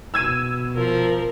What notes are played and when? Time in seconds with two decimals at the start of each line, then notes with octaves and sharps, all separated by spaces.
0.14 B2 E6 G#6 D#7
0.77 F3 A#4